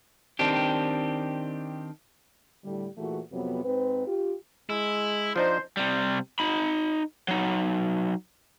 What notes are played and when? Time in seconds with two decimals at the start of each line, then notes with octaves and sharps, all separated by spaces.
0.39 D#3 C4 D4 G4
2.65 A2 D3 G3
2.97 A#2 E3 A3 F#4 G#4
3.32 F2 C3 F#3 B3
3.64 G#2 C4 B4
4.07 F4 G4
4.70 G#3 E4
5.36 F3 D4 D#4 C5
5.77 C3 G3
6.39 D#4 B5
7.28 F#3 D#4